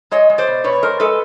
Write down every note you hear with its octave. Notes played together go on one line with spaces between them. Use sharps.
G#3 C#5 D#5
G#3
C5 D5
B2
B2 B4 C#5
G#3 A#4 C5
G#3 A4 B4